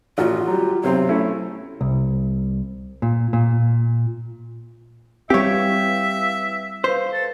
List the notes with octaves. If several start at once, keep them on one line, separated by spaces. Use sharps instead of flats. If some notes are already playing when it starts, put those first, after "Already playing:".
A1 F4 F#4
F#3 G3
B1 C3 F#3 C4
A3 C#4 E4
C2
A#2
A#2
G3 C4 E4 G4 B4 C#5 E5 F5
B4 C5 F5
A4